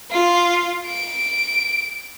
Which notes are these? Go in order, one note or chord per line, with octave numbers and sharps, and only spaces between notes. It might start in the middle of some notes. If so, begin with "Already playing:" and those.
F4
D7